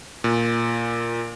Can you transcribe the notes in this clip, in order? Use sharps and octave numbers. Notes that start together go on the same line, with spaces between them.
A#2